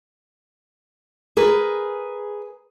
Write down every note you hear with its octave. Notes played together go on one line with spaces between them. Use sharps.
G#4 A#4 B4